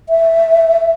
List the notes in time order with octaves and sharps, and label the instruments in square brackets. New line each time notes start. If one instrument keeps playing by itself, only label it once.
[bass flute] E5